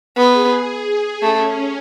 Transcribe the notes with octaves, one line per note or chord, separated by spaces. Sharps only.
B3 G#4
A3 C#4